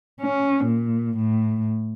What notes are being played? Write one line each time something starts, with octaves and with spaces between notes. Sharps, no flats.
C#4
A#2
A2